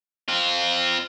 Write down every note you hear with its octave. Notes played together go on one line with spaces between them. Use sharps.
C4 F4